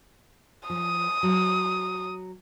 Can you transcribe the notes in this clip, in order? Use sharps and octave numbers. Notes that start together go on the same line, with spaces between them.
F3 D#6
F#3